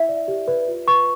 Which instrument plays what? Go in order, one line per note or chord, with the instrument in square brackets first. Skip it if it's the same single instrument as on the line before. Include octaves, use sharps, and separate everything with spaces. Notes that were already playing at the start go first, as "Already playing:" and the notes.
Already playing: [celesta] E4 E5
D5
G4
B4
F4
B4 C#6